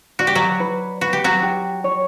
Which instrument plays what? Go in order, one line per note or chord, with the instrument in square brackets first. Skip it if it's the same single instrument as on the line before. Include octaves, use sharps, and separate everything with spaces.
[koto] F#4 [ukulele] D5
[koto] G4
F#3 F#4
[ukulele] B4
[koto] F#4 [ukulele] B4
[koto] G4
F#3 F#4
[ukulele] G4
C#5